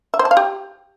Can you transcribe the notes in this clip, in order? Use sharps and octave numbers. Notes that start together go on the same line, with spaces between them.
E5
C5
A5
F5
G4